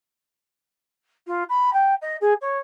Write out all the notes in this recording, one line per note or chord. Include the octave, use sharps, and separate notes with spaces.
F4
B5
G5
D#5
G#4
C#5